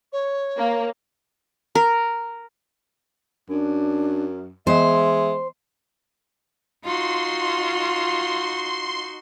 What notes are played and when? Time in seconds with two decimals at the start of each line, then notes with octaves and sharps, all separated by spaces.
0.12 C#5
0.57 A#3
1.75 A#4
3.49 F#2 D4
4.67 E3 G#3 B3 C5 D#5 E5
6.85 D#4 F4 F#4 C6